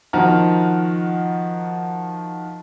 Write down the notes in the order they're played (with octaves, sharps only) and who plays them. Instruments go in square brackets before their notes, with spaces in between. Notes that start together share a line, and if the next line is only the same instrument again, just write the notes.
[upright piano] D#3 F3 F#4 A#5 F6